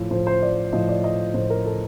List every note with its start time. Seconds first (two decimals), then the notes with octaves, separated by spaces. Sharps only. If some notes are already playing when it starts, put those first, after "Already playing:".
Already playing: A2 F3
0.11 A2 F3 C5
0.27 C5
0.42 D5
0.73 A2 F3 D#5
0.88 D5
1.04 D#5
1.34 A2 F3 C5
1.50 A#4
1.66 A4